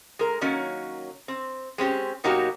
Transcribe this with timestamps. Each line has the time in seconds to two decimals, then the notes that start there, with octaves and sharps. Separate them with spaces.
0.19 G#3 A#4
0.41 D#3 F#3 A#3 C#4
1.28 C4
1.78 G#3 C4 C#4 G4
2.24 B2 F#3 A#3 D#4 F#4 G4